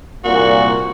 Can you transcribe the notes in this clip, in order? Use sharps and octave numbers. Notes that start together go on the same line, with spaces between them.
C2 A#2 F#4